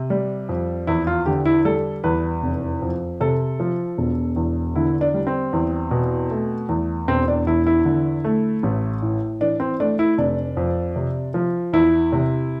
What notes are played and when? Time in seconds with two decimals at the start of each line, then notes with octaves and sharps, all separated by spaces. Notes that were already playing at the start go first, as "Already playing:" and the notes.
Already playing: C3
0.10 G3
0.49 F2
0.87 E2 E4
1.07 F4
1.26 D3 G4
1.46 E4
1.65 G3 A4
2.04 E2 B4
2.43 F1
2.82 F2
3.21 C3 A4
3.60 F3
3.98 E1
4.36 E2
4.75 D3 E4
5.01 D4
5.14 G3
5.27 C4
5.53 E2
5.91 B2
6.31 A3
6.69 E2
7.08 E1 C4
7.28 D4
7.47 E2 E4
7.67 E4
7.85 D3
8.24 A3
8.63 A1
9.02 A2
9.41 E3 D4
9.60 C4
9.80 A3 D4
9.99 E4
10.18 F1 D4
10.57 F2
10.96 C3
11.34 F3
11.73 E2 E4
12.13 C3